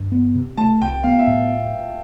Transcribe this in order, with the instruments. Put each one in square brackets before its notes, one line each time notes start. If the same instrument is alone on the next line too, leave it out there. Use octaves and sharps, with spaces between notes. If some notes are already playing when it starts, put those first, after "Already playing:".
Already playing: [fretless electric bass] G2
B3
C3
[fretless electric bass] A3 [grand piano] A5
[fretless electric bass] C2 [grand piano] G5
[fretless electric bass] B3 [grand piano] F5
[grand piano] E5
[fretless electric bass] A2